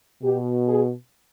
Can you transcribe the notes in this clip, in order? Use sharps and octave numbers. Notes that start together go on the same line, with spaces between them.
B2 G4
G#4